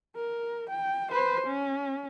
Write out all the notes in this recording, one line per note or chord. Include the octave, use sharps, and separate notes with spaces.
A#4
G5
B4 C5
C#4